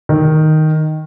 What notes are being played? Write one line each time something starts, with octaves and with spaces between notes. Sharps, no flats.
D#3